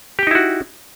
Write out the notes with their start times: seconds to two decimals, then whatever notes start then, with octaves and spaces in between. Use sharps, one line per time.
0.19 G4
0.23 G5
0.27 D#4
0.31 E4
0.35 F#4